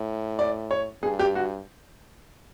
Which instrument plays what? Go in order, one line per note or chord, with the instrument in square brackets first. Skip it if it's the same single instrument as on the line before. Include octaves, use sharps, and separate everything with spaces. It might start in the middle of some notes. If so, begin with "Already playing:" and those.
Already playing: [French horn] A2
[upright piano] D5
C#5
[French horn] G2 [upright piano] G#4
[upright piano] G4
F#4